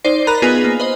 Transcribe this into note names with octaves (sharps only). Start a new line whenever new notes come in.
D#4 C5 D5 C7
A#4 A#5 B5 F#6 A6 D#7
B3 D#4 F4 G#4 B4 G#5
A#3
B4 C5 D#5